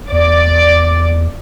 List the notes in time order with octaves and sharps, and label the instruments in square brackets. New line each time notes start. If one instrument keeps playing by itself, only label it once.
[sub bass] E2 [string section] D5